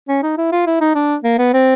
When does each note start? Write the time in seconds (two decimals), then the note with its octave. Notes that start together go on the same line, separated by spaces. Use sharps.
0.08 C#4
0.22 D#4
0.37 E4
0.52 F4
0.66 E4
0.81 D#4
0.95 D4
1.24 A#3
1.39 B3
1.53 C4